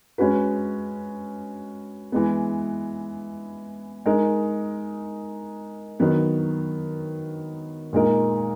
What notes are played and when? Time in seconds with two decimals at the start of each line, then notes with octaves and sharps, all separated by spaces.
0.18 G#3 C#4 F#4 B4
2.12 E3 G#3 B3
4.06 G#3 D#4 A#4
6.00 D#3 F#3 B3
7.93 A#2 G#3 D#4 A#4